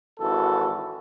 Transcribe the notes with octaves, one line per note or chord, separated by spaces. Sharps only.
G#1 E3 F#4 A4